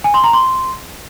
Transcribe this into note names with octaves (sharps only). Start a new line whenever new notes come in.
G#5
C6
A#5
C6